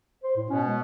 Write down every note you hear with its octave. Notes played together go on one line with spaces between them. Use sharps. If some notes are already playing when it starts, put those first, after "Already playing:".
C5
A2
B2 C#4
G#3